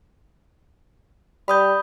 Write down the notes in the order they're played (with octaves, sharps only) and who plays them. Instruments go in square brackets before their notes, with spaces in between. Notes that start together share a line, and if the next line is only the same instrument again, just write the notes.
[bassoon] G3 [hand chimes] B5 D#6 G6